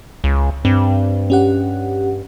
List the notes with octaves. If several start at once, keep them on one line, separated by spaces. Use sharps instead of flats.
C#2
G2 C4
C#4 G4 F#5